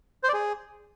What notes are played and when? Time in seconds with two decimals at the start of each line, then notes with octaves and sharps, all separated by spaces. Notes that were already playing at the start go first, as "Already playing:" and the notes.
0.24 C5
0.29 D5
0.34 G#4